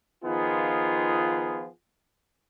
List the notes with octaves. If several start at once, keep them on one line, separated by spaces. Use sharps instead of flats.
D#3 F3 B3 D#4 F4 G#4